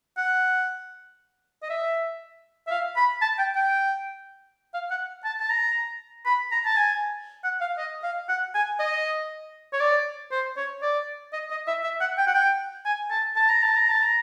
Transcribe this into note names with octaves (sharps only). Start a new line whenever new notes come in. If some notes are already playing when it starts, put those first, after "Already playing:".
F#5
D#5
E5
E5
F5
B5
A5
G5
G5
F5
F#5
A5
A5
A#5
B5
A#5
A5
G#5
F#5
F5
D#5
F5
F#5
G#5
D#5
C#5
D5
C5
C#5
D5
D#5
D#5
E5
E5
F#5
G5
F#5
G5
G#5
A5
A5
A#5
A5
A#5
A5
A#5